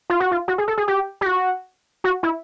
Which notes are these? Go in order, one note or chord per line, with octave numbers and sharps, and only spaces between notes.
F4
F#4
F4
F#4
G#4
A4
G#4
G4
G4
F#4
F#4
E4